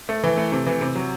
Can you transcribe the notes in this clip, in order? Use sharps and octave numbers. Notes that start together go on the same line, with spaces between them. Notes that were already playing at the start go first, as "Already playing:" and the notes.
A3
E3
A3
C3
E3
C3
F#3